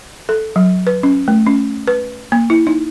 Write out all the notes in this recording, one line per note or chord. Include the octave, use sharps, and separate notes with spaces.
A4
F#3
B4
C#4
A3
C#4
B4
A#3
E4
D#4